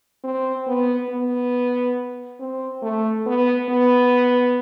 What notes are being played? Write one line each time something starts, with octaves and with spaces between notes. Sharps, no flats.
C4
B3
B3
C4
A3
B3
B3